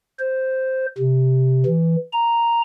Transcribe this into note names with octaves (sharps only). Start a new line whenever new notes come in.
C5
C3
E3
A#5